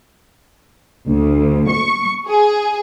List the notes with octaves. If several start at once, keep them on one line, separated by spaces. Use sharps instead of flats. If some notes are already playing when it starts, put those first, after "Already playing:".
D2
C#6
G#4